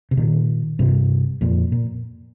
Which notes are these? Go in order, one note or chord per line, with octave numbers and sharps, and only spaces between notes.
C3
A#2 D#3
G2 C3
F2 A#2
A#2